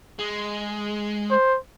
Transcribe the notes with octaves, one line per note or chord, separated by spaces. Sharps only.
G#3
C5